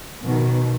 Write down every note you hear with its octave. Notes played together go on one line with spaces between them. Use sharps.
B2 D#3